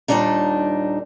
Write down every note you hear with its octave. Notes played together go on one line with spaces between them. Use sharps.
D#2 A#2 G3 D4 D#4